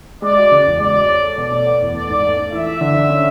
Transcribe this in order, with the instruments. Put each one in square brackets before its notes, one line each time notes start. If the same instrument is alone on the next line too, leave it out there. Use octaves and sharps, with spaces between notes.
[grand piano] G#3 [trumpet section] D5
[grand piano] F#4
C#3
E2
[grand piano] G#3 [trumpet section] D5
[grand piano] F#4
C#5
A4
[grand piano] B2 [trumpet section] D5
[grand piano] A3
B3
E2
[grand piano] A3 [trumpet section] D5
[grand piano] G#2
A3
A3
[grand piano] E3 [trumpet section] E5
[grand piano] E3
D3
D3
C#4